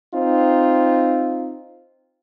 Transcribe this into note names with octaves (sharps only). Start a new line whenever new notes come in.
C4 D#4 F4